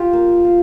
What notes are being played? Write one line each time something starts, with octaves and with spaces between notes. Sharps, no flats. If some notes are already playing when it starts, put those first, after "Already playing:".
Already playing: F4 G4
A#3
F4